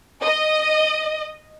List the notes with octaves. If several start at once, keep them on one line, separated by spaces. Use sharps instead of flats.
D#5